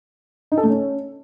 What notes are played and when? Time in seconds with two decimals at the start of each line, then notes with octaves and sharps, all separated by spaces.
0.52 D#4
0.58 A4
0.64 A3
0.69 C#4